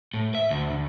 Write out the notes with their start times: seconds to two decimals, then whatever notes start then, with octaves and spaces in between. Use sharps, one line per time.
0.14 A2
0.35 E5
0.50 D2
0.71 D2